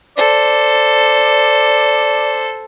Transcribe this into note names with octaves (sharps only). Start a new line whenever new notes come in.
A4 C5 D5